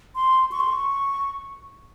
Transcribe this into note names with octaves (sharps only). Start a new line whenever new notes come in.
C6
C#6
C6
C#6